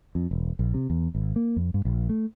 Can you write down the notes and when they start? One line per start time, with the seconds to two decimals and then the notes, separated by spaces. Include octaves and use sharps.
0.15 F2
0.31 E1
0.59 A#1
0.74 C3
0.90 E2
1.15 G#1
1.36 A#3
1.56 F2
1.74 G2
1.85 A#1
2.09 A3